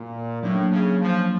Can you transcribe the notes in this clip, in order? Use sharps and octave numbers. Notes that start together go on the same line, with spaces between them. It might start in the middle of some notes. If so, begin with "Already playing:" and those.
Already playing: A#2
A2 F#3 A#3 D4
C#3
F3